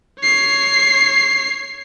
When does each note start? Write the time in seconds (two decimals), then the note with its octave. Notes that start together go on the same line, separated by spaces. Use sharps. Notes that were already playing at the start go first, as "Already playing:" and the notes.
0.21 C#5 C7